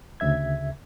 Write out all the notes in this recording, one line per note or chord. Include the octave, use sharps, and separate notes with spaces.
D2 C#3 E5 G#6